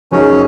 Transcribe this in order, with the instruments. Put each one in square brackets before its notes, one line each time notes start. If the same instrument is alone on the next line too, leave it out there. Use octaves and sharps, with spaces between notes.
[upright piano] F#1 F#2 F#3 D#4 G#4 [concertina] C#4